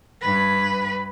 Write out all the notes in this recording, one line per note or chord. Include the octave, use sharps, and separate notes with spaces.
G2 B4